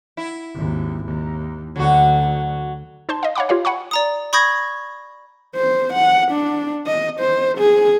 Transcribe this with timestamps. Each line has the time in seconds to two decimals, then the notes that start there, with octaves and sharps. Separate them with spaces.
0.17 E4
0.54 G#1 D#2
1.04 D#2
1.76 D2 D3 F#3 F#4
3.09 D#4 C5 A5 C6
3.23 D#5 F5
3.35 C#5 F5 F#5 B5 D6
3.49 F4 G4 C#5 F5
3.65 F#5 G#5 B5 C#6
3.91 D5 A#5 D#6
4.33 B5 C#6 D#6 G6 G#6 A#6
5.56 C5
5.93 F#5
6.32 D4
6.87 D#5
7.20 C5
7.58 G#4